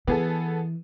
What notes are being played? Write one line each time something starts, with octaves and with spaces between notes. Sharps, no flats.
E3 B3 G#4 A4